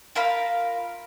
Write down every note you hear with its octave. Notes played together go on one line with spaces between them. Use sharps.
F4 A#4 F5 B5